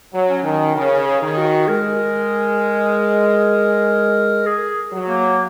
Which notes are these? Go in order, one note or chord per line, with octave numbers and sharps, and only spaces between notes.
F#3
C#4
D#3
C#3 A#4
G#4
D#3
F#4
G#3 A#4
G#4
F#3
A#3